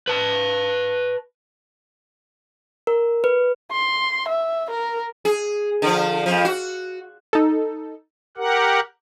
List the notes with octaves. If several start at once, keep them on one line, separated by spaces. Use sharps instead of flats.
B4 A5
A#4
B4
C6
E5
A#4
G#4
D3 F3
F2 F3
F#4
D#4 A4
G4 A#4 F#5